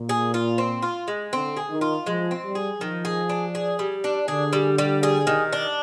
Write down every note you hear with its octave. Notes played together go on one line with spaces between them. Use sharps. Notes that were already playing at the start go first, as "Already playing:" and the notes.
Already playing: A#2
G#4
F4
C4
F4
G#3
D3 C4
G#4
D#3
F4
F3 G#3
C4
G3
G#4
D#3 F3
G#4
D4
G#4
G3
D4
D3 G#4
G3
G3
G#4
D#3
D4